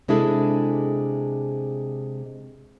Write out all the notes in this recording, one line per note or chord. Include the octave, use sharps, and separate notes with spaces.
C3 G#3 D4 E4 G#4 A4